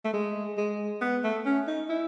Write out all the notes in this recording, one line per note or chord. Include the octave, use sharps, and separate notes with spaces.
A3
G#3
G#3
B3
A3
C#4
D#4
E4